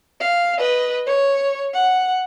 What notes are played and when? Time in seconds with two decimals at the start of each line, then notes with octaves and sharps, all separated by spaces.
0.21 F5
0.58 B4 D#5
1.07 C#5
1.74 F#5